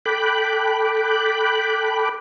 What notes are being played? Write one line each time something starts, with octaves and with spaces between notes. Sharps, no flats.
A4 G5 B5 D6 F#6